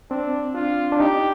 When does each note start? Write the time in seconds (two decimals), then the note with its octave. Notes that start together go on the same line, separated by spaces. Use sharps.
0.11 C4 D4
0.55 D4 F4
0.92 D4
1.00 D#4 G4